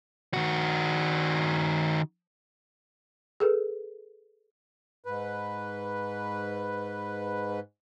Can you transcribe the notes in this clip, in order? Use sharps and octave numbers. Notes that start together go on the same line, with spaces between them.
D#3 F#4
G#4 A4 B4
G#2 B4